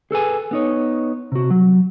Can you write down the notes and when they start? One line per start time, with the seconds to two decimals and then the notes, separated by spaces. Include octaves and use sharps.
0.11 G#4 A4 B4 G#5
0.51 B3 D#4 C#5
1.32 C3 F#4
1.50 F#3